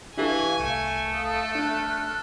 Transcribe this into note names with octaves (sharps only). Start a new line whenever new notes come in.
E3 D4 G4 A4 F5 G#5 C#6
C2 A3
A4 F5 D#6
D4 F6 F#6